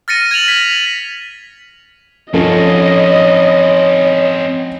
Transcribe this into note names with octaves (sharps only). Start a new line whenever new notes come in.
F6 A6 A#6 C#7 D#7
G#6 D#7 F7 F#7
B6
F3 C4 C#4 D#4 A4 C#5 D#5